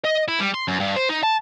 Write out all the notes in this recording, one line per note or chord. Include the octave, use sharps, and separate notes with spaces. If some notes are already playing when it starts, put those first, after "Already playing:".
D#5
E4
G3
C6
F#2
G2
C5
D#4
A5